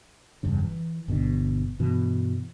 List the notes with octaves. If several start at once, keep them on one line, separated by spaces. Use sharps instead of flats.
F1 E2 G2 C#3
E3
G1 B2 D3
G2 B2 E3